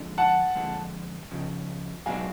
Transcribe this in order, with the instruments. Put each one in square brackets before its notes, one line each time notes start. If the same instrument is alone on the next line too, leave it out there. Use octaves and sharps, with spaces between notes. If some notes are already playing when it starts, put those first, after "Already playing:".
Already playing: [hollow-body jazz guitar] F2 D3 G#3 D4
[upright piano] F#5 A5
[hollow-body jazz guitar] F2 D3 G#3
C#2 C#3 F3
[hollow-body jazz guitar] B1 B2 G#3 D4 F#4 [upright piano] F5 G#5